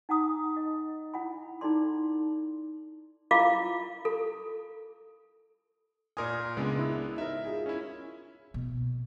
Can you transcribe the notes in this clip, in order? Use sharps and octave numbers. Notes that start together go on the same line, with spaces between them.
D#4 F#5 A#5 D#6
D#5
E4 F#5 B5
D#4 E4 A4 D5 C6
E4 F4 F5 D6
A4
A#2 A#4 D5 G#5 C6 D#6
C#2 G#3 B3 D4
E4
D#4 A#4 E5
F4 G#4
C#4 E4
B2